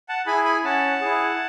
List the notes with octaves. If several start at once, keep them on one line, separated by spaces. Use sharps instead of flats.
F#5 A5
E4 G#4 G#5 B5
G#5 B5
C#4 F#5 A5
E4 G#4